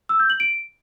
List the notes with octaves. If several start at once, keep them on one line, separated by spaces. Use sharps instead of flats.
E6
G6
F#7
D7